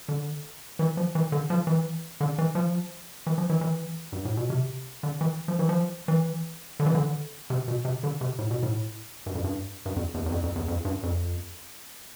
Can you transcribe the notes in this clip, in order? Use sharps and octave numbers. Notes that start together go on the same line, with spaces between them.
D3
E3
F3
E3
D3
F3
E3
D3
E3
F3
E3
F3
E3
E3
G2
A2
B2
C3
D3
E3
F3
E3
F3
E3
D3
E3
D3
C3
B2
C3
D3
C3
A2
B2
A2
G2
F2
G2
G2
F2
E2
E2
F2
F2
E2
F2
G2
F2